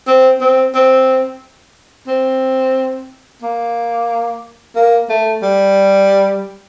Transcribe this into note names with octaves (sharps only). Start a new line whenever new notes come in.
C4
C4
C4
C4
A#3
A#3
A3
G3